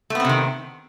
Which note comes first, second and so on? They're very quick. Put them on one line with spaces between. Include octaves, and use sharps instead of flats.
A3 B3 C4 C3 D#3